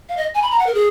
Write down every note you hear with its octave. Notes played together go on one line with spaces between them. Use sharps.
F5
D#5
G#5
B5
A#5
F#5
A#4
G#4